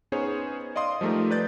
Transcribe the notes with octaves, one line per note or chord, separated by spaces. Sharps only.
B3 C#4 D#4 G#4 C5 C#5
D5 D#5 F5 C6 D#6
F3 G3 A3 D#4 A#4
B4 D5 G6 A6